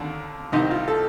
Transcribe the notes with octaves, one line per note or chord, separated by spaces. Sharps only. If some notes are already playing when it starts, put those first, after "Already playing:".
Already playing: D#2 D3 D4
C2 C3 D#3 D#4
F4
A4